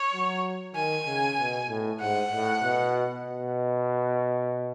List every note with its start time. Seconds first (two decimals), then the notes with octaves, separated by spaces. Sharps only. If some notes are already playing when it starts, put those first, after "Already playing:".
Already playing: C#5
0.13 F#3
0.75 D#3 G#5
1.07 C#3
1.38 B2
1.69 A2
2.01 G#2 F#5
2.32 A2
2.63 B2
3.25 B2